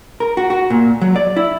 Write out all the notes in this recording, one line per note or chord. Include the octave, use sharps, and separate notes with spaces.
A#4
F#4
F#4
A#2
F#3
D5
E4